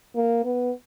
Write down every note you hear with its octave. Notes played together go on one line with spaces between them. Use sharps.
A#3
B3